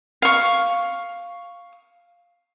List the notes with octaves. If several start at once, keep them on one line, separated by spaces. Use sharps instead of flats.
F5 C#6